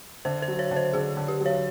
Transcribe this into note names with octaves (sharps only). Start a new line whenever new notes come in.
D3 C5
C5
F#3
C#5
D3
C5
D3 G#4
D3
G4
F#3
C#5